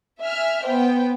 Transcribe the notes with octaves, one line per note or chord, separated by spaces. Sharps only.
E5 G#5 F6
B3 C5 G5